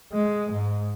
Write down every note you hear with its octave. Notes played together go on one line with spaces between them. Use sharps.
G#3
G#2